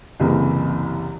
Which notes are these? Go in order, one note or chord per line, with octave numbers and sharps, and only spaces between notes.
F#1 C2 E3